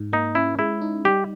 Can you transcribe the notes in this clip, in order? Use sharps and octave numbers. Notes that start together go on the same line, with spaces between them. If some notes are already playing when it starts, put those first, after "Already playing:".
Already playing: G#2
A#3 D#4
C#4 E4
G#3 E4
D#4
G3 G4